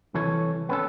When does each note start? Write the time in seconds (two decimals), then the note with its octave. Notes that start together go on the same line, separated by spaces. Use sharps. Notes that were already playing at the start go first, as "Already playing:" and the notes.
0.14 C2 E3 A4 C#5
0.69 B3 C#4 A4